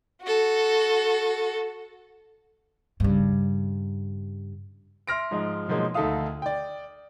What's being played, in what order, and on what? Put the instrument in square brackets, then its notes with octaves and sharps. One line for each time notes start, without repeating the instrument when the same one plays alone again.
[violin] F#4 A4
[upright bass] G2 C#3
[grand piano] E5 C6 F6 A#6 D7
G#2 F3 G#3
B2 D#3 F3 F#3 G#3 A#3
D2 D#3 A4 E5 F5 D#6
D5 G5